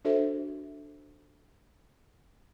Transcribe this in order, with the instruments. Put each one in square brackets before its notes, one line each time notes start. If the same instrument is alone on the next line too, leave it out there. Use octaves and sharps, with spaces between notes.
[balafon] D4 F#4 A4 C5 E5